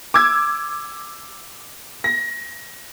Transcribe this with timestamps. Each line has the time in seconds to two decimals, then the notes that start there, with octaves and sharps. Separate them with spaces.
0.14 D6 E6 G#6
2.04 A#6